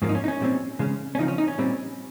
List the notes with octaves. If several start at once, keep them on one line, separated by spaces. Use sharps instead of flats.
G#2 F3 A#3 C#4
D#4
C#4
D#4
C#4
A#2 G3 C4
C#3 G#3 C#4
C#4
C#3 F3 C4 D#4
C#4
D#4
C#4
A#2 G3 C4